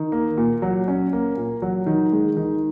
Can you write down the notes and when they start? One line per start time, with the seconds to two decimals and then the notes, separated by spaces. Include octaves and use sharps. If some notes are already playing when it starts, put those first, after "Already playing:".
Already playing: D#3
0.12 A#3
0.38 A#2
0.62 F#3
0.88 C#4
1.13 A#3
1.37 A#2
1.62 F#3
1.86 D#3
2.12 G#3
2.37 D#3